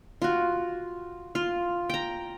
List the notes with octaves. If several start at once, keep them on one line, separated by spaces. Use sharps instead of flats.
F4 F#4
F4
G5 A#5